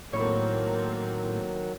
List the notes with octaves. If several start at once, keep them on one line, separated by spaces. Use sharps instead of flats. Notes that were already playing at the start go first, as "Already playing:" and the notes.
A2 D#3 F#3 A#3 C4 E4 A4 C#5